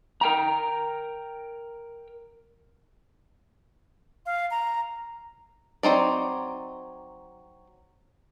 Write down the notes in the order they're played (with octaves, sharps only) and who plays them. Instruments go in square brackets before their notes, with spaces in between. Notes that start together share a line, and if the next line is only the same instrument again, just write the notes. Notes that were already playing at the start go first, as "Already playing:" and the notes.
[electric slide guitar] A#4 G5 A#5
[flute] F5
A#5
[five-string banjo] F#3 C4 D#4 D5